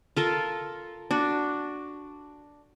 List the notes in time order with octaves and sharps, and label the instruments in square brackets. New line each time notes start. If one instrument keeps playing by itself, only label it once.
[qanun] F4 A4 A#4
D4 F#4